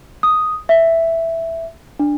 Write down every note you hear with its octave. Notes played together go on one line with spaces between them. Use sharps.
D#6
E5
D4